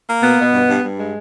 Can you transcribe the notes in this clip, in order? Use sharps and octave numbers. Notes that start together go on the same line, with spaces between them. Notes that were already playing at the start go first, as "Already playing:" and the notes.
A#3
B2 B3
B2
G2
G2
G2
G#3